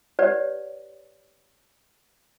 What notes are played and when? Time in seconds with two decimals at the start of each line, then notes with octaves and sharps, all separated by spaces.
0.19 G4 B4 C#5 D5 F#5